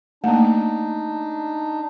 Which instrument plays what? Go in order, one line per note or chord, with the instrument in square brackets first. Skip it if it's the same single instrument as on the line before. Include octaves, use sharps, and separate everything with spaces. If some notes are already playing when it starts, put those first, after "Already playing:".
[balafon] A3 A#3 [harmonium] D4 D#4